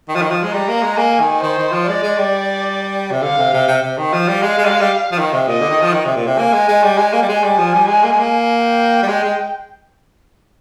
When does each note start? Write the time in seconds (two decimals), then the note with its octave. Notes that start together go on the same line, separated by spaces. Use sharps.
0.08 D#3
0.15 F3
0.22 D#3
0.31 F3
0.43 G#3
0.53 G3 A#5
0.68 A#3
0.82 G#3
0.97 A#3 G#5
1.20 D#3
1.43 D#3 C5
1.58 D#3
1.72 F3
1.87 G#3 D5
2.03 G#3
2.18 G3
3.11 C3
3.23 D3 F5
3.38 C3
3.54 C3
3.67 C3
3.82 C3
3.98 D#3
4.13 F3 F5
4.28 G3
4.42 G#3
4.58 G#3
4.65 G3
4.70 G#3
4.80 G3
5.12 F3
5.19 D#3
5.33 C3
5.47 A#2 D#5
5.61 D3
5.70 D#3
5.82 F3
5.93 D#3
6.05 C3
6.16 A#2
6.27 C3
6.38 A#3 G#5
6.53 G#3
6.68 G#3
6.83 G3
6.98 G#3
7.13 A#3
7.22 G3
7.29 G#3 G#5
7.44 G3
7.58 F3
7.74 G3
7.88 G#3
8.04 A#3
8.11 G#3
8.19 A#3
8.64 G5
9.03 G3
9.08 G#3
9.23 G#3